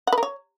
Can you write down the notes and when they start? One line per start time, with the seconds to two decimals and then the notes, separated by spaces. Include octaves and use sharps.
0.07 F#5
0.13 B4
0.18 A#4
0.23 C#5